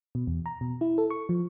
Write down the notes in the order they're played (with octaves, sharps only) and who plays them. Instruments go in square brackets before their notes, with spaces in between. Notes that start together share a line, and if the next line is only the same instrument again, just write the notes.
[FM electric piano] B2
E2
A#5
B2
E4
A4
C#6
F3